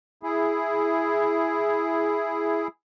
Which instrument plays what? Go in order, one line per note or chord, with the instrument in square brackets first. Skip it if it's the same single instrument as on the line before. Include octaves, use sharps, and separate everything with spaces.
[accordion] E4 G#4